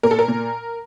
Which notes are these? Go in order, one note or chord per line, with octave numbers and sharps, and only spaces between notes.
A#2 A#4
A4
A#4
A#2